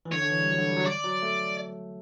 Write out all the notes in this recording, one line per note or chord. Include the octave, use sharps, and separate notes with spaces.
E3
D3 C#5
D3
E3
G3
F#3
D3
G3
F#3
D5
F#3
A3